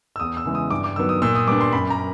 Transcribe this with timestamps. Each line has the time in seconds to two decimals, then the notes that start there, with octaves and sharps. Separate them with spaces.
0.16 E6
0.20 E2 D#6
0.37 E6
0.45 C#3 E3 G#3
0.55 D#6
0.71 G2 D6
0.84 D6
0.96 D#3 F#3 B3 E6
1.09 D#6
1.22 A#2 E6
1.35 D#6
1.48 G3 B3 D4 D6
1.61 C6
1.73 F#2 B5
1.90 A#5